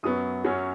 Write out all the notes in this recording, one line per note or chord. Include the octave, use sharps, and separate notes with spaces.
F#2 F#3 B3 D#6
F#2 F#3 C#4